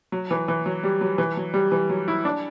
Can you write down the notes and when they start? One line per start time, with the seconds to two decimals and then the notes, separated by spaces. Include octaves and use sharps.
0.12 F#3
0.31 E3
0.48 E3
0.66 F#3
0.83 G3
1.01 F#3
1.18 E3
1.37 F#3
1.54 G3
1.72 E3
1.90 F#3
2.08 E4
2.25 D4